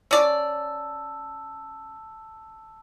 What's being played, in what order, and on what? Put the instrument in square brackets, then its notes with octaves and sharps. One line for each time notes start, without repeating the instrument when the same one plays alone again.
[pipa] C#4 D5 [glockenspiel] A5 E6